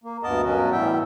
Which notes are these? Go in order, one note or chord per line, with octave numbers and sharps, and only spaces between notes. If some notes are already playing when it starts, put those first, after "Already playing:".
A#3
D2 G2 B3 A#4 D#5 A5
G2 B2 F#3 C#4 F#4
A2 E3 G3 B3 E5 G5